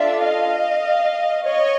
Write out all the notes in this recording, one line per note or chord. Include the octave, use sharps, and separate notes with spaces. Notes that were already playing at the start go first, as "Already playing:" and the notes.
Already playing: D4 F4 A4 D5 E5
D#5 F5
C#5 D#5